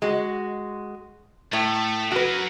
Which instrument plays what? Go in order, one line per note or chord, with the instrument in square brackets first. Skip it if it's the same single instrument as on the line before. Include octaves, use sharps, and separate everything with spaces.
[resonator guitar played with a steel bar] G#3 F#4
[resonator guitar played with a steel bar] A2 [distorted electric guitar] A3
[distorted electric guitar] F#3 A#4 [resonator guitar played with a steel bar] F#4 B4